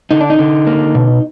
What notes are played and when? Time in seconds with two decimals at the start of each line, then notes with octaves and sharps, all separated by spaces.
0.11 D3 D#4
0.21 D4
0.30 D#4
0.39 D3
0.67 A#3
0.95 B2